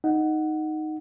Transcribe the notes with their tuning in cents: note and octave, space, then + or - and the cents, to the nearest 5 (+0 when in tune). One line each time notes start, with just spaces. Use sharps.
D#4 +0 F#5 +0